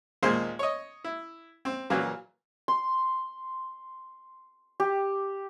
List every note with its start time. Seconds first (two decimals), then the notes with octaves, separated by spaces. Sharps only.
0.23 D#2 A#2 G#3 C5 C6
0.59 C#5 D#5
1.04 E4
1.65 C4
1.90 A#2 C#3 E3 F#3 A#3
2.68 C6
4.80 G4